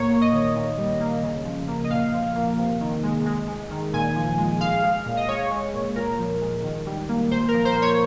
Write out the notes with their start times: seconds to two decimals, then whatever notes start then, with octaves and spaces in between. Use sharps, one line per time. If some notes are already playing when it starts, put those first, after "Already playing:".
Already playing: A#2 A#3 C#5
0.10 A#3
0.21 D#5
0.33 D#3
0.56 A#2
0.78 G3
1.00 A#3
1.23 C#3
1.45 F3
1.67 A#3
1.84 D#5
1.90 A#2 F5
2.13 F3
2.35 A#3
2.58 C3
2.80 D#3
3.03 G#3
3.26 G#3
3.48 G#3
3.70 D#3
3.93 A#2 G#5
4.16 F3
4.38 G#3
4.61 G#3 F5
4.83 G#3
5.06 A#2
5.17 D#5
5.28 G#3 C#5
5.51 G#3
5.73 A#2
5.95 A#2 A#4
6.19 F3
6.41 G#3
6.63 D#3
6.86 G3
7.09 A#3
7.30 A#2 C5
7.48 A#4
7.53 F3
7.65 C5
7.76 A#3
7.82 C#5